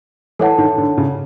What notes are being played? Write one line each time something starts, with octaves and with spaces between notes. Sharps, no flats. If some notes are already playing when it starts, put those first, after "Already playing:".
E3 A4 C#5 F#5 A5
D#3
D3
C#3